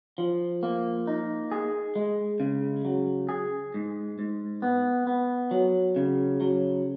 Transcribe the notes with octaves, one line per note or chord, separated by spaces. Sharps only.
F3
A#3
D#4
G#4
G#3
C#3
F#3
G#4
G#2
G#2
B3
B3
F#3
C#3
F#3